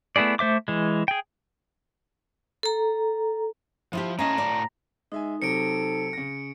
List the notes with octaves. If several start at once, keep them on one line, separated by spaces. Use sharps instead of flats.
A3 B3 E4 G#4 D5
A3 C5 E5 D6
E3 G#3
G#4 G5
A4 A#5
F3 E4 F4 G4
A2 C#4 D#5 F5 A5 A#5
D5
G#3 D#4 E5 G#5
C3 F#3 C4 A4 C#7 D7
C#3 A#6